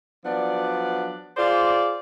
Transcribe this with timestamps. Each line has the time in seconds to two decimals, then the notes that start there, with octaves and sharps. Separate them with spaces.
0.25 F3 F#3 B3 D4 D5
1.36 F4 G#4 C5 D5